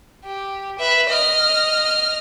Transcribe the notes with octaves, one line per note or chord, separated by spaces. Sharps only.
G4
B4 E5
D#5 F6